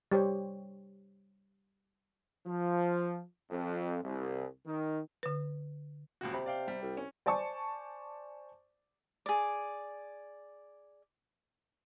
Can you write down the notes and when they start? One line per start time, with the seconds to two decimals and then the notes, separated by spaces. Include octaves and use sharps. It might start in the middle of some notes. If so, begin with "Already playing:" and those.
0.12 G3 G4 C5 C#5
2.46 F3
3.51 F2
4.04 C2
4.65 D#3
5.23 D3 B4
6.21 D#1 C#2 F#4
6.33 C3 B5
6.46 D5 F5 G5
6.68 G3
6.83 C2
6.97 C#4
7.26 C5 D5 G#5 A5 C#6
9.26 G#4 D5